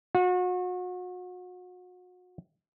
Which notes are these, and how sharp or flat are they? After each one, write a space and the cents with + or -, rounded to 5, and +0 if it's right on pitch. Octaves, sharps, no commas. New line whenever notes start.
F#4 -35